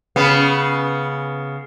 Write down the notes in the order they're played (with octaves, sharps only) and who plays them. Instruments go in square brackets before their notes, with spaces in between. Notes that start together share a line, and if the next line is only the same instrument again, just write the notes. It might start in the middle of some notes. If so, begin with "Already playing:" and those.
[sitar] C#3 B3